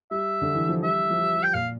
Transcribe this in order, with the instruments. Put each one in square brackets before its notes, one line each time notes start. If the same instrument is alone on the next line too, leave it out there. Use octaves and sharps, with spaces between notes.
[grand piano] G3 [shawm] E5
[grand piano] D3
E3
F3
[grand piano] G3 [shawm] E5
[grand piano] F3
G3
G3
[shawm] G5
[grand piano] A#2 [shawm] F5